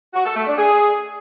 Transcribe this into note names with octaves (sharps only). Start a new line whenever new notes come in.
F#4
A4
A3
D4
G#4